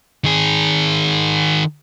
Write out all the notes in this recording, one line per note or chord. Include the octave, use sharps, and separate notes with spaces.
D#3 G#4